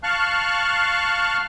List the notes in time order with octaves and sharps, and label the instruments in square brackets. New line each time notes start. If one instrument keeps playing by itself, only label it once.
[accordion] F5 A5 C#6 F6 F#6